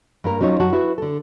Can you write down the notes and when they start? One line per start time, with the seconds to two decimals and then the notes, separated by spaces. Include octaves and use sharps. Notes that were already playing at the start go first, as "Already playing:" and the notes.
0.24 G2 A#3 A#4
0.41 F#3 C#4 D#4 F4 C#5
0.60 F#2 F#3 F#4 A5
0.73 E4 F#4 B4 E5
0.98 D3 A4